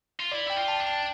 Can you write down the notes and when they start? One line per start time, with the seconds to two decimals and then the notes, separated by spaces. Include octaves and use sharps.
0.20 F4
0.32 E4 D5
0.48 E4 G5
0.56 F4
0.68 A5
0.80 D4
0.87 A5